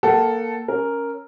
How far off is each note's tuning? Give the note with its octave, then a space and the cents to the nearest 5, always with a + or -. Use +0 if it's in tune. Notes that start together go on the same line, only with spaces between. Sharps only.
A#3 +0 A4 +0 F#5 +35
C#4 +0 A#4 +0